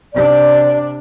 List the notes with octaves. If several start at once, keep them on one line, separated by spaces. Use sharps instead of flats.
C3 D4 D5